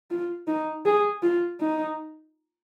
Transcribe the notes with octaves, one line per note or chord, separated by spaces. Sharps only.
F4
D#4
G#4
F4
D#4